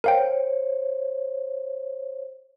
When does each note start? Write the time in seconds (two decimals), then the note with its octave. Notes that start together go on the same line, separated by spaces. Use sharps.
0.04 A#4 C5 C#5 F5 G5